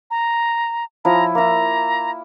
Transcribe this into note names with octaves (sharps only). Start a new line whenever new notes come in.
A#5
F3 E4 A#5
A#3 E4 A#5